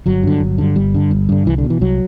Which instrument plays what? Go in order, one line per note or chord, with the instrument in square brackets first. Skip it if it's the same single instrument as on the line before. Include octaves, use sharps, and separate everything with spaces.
[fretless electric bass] G1 F#3
G2 D3
G1
G2 D3
G1 G3
G2 D3
G1
G2 D3
C2 E3
D3
B2
E3
C2 F#3